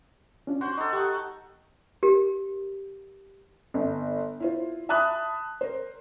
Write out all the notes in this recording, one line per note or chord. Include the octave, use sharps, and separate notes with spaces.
C#4 D4 F4
F#4 C5 C6
D#4 A4
G4 F#5 C#6
G4 A#4
G1
E4 F4 C5
E5 A5 B5 D#6 F#6
A#4 C5